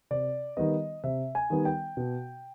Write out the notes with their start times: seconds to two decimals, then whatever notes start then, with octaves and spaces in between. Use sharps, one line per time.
0.11 C3 D5
0.57 D#3 G3 B3 D#5
1.04 C3 E5
1.35 G#5
1.50 D#3 G3 B3
1.65 G5
1.97 B2